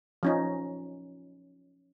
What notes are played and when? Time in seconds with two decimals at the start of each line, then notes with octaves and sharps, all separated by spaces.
0.23 F3 C#4 D#4